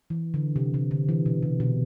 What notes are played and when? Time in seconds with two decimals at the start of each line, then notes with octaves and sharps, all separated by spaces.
0.10 E3
0.34 D3
0.56 C3
0.74 C3
0.91 D3
1.09 E3
1.26 B2
1.43 C3
1.60 B2